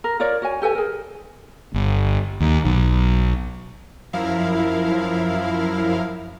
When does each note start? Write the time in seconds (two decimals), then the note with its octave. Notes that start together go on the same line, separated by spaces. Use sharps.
0.04 A#4
0.19 F4 A#4 C#5 D5
0.42 F#4 C#5 G#5
0.62 G4 A4 B4 G#5
0.75 G#4 A#4
1.74 G1
2.40 D#2
2.65 B1
4.13 F#2 F3 E4 A#4 F5